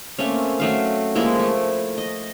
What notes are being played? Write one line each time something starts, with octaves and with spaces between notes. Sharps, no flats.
A3 A#3 C4 C#4
F#3 A3 F5
F3 G#3 A#3 E4
A3
D#5